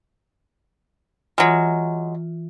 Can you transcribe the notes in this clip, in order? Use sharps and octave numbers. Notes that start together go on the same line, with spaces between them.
E3 F#3 G#3 F4